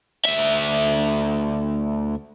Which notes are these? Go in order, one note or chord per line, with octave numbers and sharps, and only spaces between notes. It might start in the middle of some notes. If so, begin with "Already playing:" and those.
D2 E5